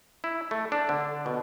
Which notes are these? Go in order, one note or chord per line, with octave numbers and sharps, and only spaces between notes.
E4
A3
D4
D3
B2